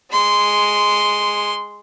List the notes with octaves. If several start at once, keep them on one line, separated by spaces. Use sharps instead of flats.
G#3 C6